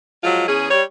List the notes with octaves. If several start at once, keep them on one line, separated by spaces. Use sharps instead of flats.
F3 F#3 G#3 F4
E2 C#4 G#4
G3 C#5